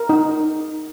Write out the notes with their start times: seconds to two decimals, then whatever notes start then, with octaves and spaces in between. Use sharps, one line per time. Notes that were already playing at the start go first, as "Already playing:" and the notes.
Already playing: A#4
0.09 D#4